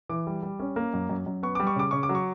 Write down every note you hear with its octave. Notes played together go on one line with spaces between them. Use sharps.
E3 D6
G3
G3
C#4
A#3
F#2
F#2
F#2
B3 C#6
G3 D6
C#6
C#3 D6
C#3 C#6
D6
F#3
C#6